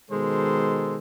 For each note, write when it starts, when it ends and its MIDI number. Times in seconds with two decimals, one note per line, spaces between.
0.10 0.97 47
0.10 0.97 51
0.10 0.97 56
0.10 0.97 69
0.10 0.97 72